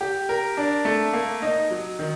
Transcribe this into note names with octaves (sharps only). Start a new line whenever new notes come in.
G4
A#4
D4
A3
A#3
D#4
F#3
D#3